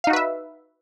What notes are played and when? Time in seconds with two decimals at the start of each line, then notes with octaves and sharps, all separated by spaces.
0.04 F5
0.07 D#4
0.10 F#4
0.13 B4
0.16 E5